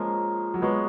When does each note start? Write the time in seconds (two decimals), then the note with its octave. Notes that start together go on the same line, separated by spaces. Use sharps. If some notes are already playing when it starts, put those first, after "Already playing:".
Already playing: F3 G#3 A#3 C#4
0.54 F#3
0.62 G#3 B3 F#4 C#5